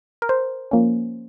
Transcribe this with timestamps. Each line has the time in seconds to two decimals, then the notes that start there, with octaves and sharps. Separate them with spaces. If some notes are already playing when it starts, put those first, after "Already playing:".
0.22 A#4
0.29 C5
0.71 F3 A#3 C#4